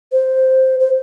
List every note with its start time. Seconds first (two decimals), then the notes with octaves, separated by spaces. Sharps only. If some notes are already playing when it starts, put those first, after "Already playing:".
0.12 C5
0.80 C5